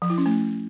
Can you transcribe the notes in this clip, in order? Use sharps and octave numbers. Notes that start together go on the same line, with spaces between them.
F3
E4
C#4
A3